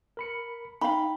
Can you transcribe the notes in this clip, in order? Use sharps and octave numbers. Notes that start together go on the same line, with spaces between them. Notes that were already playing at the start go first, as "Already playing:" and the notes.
A#4 B5 C#7
D#4 F5 G5 B5